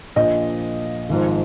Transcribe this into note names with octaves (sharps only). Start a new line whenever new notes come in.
A#1 A#2 F3 D#5
G#1 G#2 F3